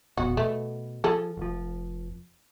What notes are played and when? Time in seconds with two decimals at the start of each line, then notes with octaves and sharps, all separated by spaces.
0.17 E1 A#1 B3 F#4
0.37 B2 A3
1.04 F3 G#4 A4
1.37 F1 F3